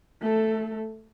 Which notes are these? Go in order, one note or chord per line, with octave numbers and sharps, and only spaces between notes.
A3 A4